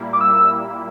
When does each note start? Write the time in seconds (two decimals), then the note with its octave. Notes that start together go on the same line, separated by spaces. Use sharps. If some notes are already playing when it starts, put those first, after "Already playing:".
Already playing: A#2 G3 A#3 E4
0.13 D6
0.21 E6